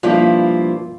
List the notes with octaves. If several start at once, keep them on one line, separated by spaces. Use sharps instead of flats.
G2 F3 A#3 E4 F4